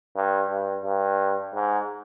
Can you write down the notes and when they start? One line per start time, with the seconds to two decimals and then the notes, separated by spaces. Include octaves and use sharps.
0.16 G2
0.50 G2
0.84 G2
1.54 G#2